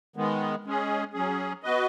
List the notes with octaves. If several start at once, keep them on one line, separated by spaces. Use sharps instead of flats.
D#3 G#3 B3
G#3 C#4 G#4
F#3 C#4 G#4
B3 F#4 B4 D#5